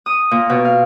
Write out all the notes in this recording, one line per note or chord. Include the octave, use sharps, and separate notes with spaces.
D#6
A#2
B2
F5